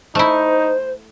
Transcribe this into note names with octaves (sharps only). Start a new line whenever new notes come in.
A3 D#4 E4 C5